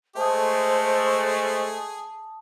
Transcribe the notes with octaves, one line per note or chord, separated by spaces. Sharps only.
G#3 A3 G#4 C5 A5 D#6